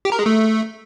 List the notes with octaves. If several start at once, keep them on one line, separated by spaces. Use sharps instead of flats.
G4
A#4
G#3
A3